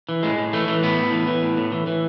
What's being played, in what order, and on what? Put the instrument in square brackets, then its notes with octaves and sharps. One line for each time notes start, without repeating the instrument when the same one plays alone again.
[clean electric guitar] E3
A2 G#3
A2
E3 A3
E3
A2 B3
A2
E3
E3
A2
A2
E3
E3